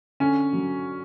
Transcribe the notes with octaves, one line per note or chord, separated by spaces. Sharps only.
D3 C#4
F#3